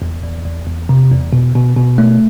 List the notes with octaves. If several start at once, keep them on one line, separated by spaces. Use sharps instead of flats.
E2
E2
E2
E2
C3
E2
B2
B2
B2
A3